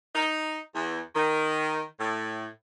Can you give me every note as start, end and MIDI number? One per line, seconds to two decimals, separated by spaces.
0.15 0.58 63
0.75 1.00 40
1.15 1.83 51
1.99 2.47 45